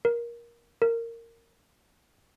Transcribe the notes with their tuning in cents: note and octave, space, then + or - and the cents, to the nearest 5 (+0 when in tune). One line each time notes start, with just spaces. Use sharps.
A#4 +20
A#4 -15